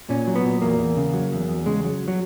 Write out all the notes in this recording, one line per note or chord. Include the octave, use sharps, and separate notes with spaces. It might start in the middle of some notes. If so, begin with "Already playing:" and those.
A#2 C#4
F#3
B3
A#2
E2 A#3
E2
C#3
F#3
E2
E2
C#3 G#3
F#3
F#3